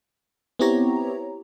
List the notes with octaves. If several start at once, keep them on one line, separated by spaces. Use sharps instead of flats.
B3 C4 E4 G4 C#5 A#5